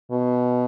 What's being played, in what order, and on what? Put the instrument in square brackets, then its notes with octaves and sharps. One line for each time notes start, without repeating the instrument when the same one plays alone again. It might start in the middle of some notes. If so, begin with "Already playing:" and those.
[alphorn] B2